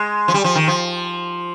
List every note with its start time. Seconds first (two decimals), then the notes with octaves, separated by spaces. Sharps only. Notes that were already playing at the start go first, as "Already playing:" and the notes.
Already playing: G#3
0.28 F3
0.34 G3
0.44 F3
0.55 D#3
0.68 F3